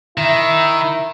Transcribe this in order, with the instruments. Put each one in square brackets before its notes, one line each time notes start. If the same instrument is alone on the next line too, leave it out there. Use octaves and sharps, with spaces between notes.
[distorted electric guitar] D#3 [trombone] E4